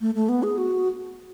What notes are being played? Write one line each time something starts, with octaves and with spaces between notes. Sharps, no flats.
A3
A3
B3
G#4
F#4